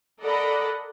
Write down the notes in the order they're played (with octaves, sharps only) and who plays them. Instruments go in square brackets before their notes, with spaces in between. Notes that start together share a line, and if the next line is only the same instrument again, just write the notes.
[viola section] A4 A#4 D5 D#5 F#5 B5